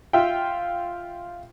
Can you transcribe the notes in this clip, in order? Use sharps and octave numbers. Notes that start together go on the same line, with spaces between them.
F4 E5 F5 G5